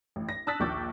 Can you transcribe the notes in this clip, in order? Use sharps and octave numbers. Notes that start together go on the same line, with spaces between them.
A1
A#6
A5 D#6 E6 F#6 A6 B6
A#1 D#2 C#6 D6 G6 A6